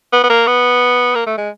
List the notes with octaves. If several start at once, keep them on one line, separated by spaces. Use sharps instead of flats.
B3
B3
A#3
B3
A#3
A3
G#3